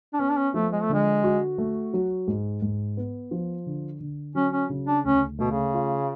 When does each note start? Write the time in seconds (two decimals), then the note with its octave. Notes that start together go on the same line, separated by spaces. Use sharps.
0.13 D4
0.20 B3 C#4
0.30 D4
0.37 C#4
0.54 F3 A3
0.72 G#3
0.82 A3
0.90 D3 G#3
1.24 F#4
1.58 A3
1.94 F#3
2.28 G#2
2.62 G#2
2.97 B3
3.31 F3
3.66 D3
4.00 D3
4.35 F#3 C#4
4.53 C#4
4.70 C#3
4.87 D4
5.04 D2 C#4
5.39 B2 A3
5.51 C#3
5.74 F4